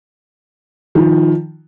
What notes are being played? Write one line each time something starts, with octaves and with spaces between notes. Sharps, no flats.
D#3 F3